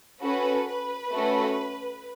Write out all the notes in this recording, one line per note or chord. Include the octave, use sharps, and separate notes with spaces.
C#4 F#4 A4 B4
B4
A3 C#4 F#4 A4